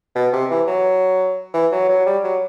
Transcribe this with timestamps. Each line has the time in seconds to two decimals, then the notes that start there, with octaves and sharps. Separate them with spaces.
0.15 B2
0.33 C3
0.50 E3
0.67 F#3
1.54 E3
1.72 F#3
1.89 F#3
2.06 G3
2.24 F#3